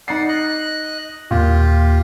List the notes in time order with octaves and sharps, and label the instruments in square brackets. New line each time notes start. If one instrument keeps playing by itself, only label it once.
[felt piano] D#4 C7 [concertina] D5 F#5
[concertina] D#5 F#6
[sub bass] D#2 [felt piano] A#2 [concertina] F4 G4